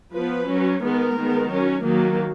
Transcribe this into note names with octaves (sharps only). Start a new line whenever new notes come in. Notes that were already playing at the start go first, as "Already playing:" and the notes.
F3 B3 B4
F#3 C#4
D#3 G#3 B3 A#4
D#3 G#3 B3
F#3 C#4
D#3 F#3 A#3